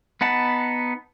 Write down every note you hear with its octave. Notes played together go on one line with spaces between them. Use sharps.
B3 D#4 F#5 A5 B5